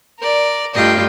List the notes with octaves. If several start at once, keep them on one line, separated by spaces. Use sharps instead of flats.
A#4 D5
G2 A3 F4 D#5 G5